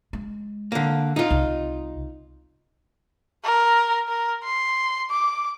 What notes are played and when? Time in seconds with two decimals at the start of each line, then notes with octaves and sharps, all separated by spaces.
0.13 G#3
0.72 D3 A#3
1.16 D#4 F4
1.31 C2
3.44 A#4
4.08 A#4
4.43 C6
5.10 D6